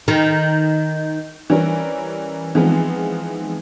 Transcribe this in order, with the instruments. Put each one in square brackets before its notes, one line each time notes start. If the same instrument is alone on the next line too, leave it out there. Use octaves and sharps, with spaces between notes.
[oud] D#3
[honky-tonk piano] E3 G3 C#4 A#4
E3 F3 G#3 B3 C4 D#4